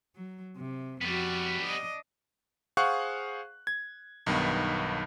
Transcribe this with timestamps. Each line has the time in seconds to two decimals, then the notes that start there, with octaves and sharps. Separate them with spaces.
0.16 F#3
0.57 C3
1.02 F2 G3 B3 F#4
1.62 D4 D#5
2.77 G#4 C5 F5 F#5 C#6 F#6
3.67 G#6
4.26 B1 G2 D#3 B3